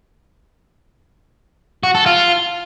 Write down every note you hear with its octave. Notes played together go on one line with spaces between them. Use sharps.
F#4
A4
F4